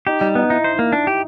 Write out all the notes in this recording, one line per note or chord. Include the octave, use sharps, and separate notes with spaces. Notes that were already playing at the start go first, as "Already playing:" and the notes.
D#4 G4
G3 D#4
B3 D#4
D#4 E4
C5
A#3
D4
G4